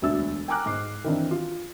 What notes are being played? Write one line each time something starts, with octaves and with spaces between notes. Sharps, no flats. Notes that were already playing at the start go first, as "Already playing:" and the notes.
E1 D2 D4 E5 E6 A6
G5 G#5 A#5 D6 F6 F#6
G#2 D6 C7
D#3 E3 C4 D4
F4